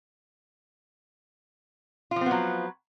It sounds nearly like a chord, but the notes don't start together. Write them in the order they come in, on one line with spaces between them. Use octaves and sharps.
F4 F3 C4 B3 F#3